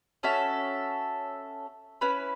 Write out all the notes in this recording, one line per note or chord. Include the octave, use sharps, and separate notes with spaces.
C#4 F#4 A4 E5
C#4 E4 B4